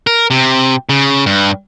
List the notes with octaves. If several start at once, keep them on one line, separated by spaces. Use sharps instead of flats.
A#4
C3
C#3
G2